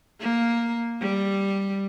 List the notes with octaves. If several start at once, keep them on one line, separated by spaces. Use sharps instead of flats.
A#3
G3